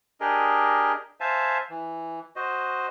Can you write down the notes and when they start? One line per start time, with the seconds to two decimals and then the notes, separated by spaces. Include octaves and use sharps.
0.21 D4 G4 G#4 A#4 D#5
1.20 C5 E5 F5 G#5 A5
1.70 E3
2.36 F#4 C5 D#5